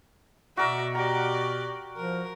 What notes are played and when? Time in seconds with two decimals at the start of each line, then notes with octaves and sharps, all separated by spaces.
0.57 B2 F#4 A#4 D5 E5
0.95 G4 D5 A#5
1.96 F3 A#4